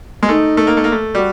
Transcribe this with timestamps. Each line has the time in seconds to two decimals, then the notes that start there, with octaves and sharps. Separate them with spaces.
0.23 G#3
0.29 A3 D#4
0.57 A3
0.67 A#3
0.77 A3
0.84 A#3
0.92 A3
1.15 G3 F#4